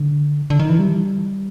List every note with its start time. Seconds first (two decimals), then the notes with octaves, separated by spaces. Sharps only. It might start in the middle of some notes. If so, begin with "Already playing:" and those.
Already playing: D3
0.50 D3
0.60 D#3
0.69 E3
0.79 G3